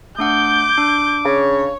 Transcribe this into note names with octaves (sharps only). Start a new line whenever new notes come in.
A3 D4 F#5 D6 G6
D4
C#3 C#5